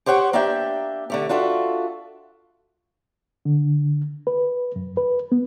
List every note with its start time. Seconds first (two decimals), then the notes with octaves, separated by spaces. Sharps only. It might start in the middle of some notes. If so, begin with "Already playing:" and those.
0.06 G4 C5 C#5 F#5 G5
0.33 A#3 D4 G4 E5 G5
1.10 D3 A3 G4
1.29 D4 F4 F#4 A4 E5
3.45 D3
4.27 B4
4.76 F#2
4.97 B4
5.32 B3